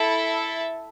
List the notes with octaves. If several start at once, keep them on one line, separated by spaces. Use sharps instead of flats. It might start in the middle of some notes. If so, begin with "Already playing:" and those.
Already playing: E4 A4 E5